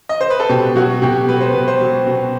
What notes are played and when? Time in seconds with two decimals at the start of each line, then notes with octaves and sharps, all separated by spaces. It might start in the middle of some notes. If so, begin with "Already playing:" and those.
0.09 D#5
0.21 C5
0.30 B4
0.40 A4
0.49 B2 G4
0.76 F#3 F#4
1.02 B2 G4
1.29 F#3 B4
1.41 C5
1.54 B2 B4
1.68 C5
1.81 F#3
2.07 B2